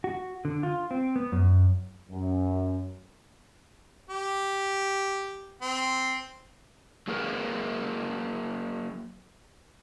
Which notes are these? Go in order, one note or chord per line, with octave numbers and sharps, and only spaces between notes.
F#4
D3
F4
C4
B3
F#2
F#2
G4
C4
F#3 A#3 G#4 A#4 B4 G5